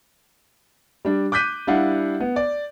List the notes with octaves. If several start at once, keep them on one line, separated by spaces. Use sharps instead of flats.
G3 D4
D6 F#6 G6 B6 D#7
G3 D4 E4 F5 F#5
B3
D5